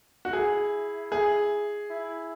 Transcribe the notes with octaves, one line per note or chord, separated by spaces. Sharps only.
F#4
E4 G#4
G#4
E4